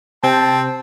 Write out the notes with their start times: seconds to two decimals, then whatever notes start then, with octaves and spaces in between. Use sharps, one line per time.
0.24 C3 C4 C5 A5 G6